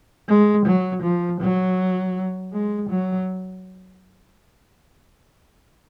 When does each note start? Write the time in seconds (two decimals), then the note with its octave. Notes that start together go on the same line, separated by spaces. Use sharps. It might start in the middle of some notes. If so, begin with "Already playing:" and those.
0.29 G#3
0.66 F#3
1.03 F3
1.41 F#3
2.53 G#3
2.90 F#3